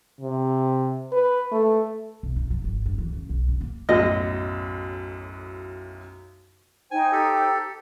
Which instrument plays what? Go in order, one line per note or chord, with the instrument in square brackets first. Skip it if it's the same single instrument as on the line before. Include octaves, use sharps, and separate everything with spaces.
[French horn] C3
B4
A3
[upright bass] B1
D#4
F3
G#1
G2
E3
C#3
B1
C#3
A#3
[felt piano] B1 F#2 A2 [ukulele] D#5
[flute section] D#4 C5 G5 [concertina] G#5
[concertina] G4 A4